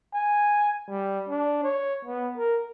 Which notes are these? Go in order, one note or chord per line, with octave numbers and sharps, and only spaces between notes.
G#5
G3
D4
C#5
B3
A#4